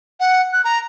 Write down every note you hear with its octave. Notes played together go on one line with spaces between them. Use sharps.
F#5
F#6
A#5